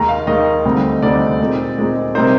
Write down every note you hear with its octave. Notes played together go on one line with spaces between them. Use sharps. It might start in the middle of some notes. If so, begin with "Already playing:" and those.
Already playing: D#2 D#3 G#3 A#5
F5
D#2 D#3 G#3 D#5
D2 D3 G3 C4 D#4
D2 D3 G3 C4 D#4 D5
A#2 G#3 C4 D#4
A#2 G#3 C4 D#4
C3 G3 A#3 D#4 C5